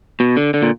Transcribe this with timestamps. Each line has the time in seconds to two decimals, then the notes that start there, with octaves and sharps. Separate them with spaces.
0.20 B2
0.37 D3
0.54 D3
0.62 A#2